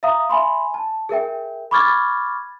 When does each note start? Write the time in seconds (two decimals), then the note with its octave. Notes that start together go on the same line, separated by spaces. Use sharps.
0.03 E5 F5 A#5 D#6
0.29 E5 G#5 B5 C6
0.74 A5
1.09 G#4 A#4 E5 G5
1.71 B5 C#6 D6 F6 G#6 A6